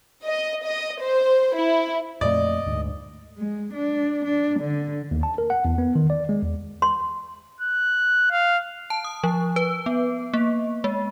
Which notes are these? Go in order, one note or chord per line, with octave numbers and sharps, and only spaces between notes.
D#5
D#5
C5
E4
F2 A#2 A3 D5 D#5
D2 G#2
G#3
D4
D4
D3
D#2
A5
A#4
F#5
E2
B3
D#3
D5
G#3
E2
C6
F#6
F5
A5
D#6
F3
B4
B3
A#3
G#3